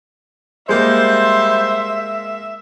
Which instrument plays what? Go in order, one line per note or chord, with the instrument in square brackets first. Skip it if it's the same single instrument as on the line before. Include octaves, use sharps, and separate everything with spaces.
[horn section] G3 C5 [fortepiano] G#3 A#3 [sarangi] E5